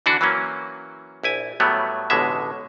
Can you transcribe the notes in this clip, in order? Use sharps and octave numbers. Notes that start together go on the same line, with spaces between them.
D3 E3 D4 F#4
E3 F#3 A#3 C#4
A#1 E4 G#5
A2 F#3 G3 A3 B3
A1 B2 D3 G#3 E5